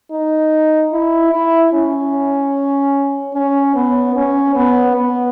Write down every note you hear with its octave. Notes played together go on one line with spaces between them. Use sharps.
D#4
E4
E4
C#4
C#4
B3
C#4
B3
B3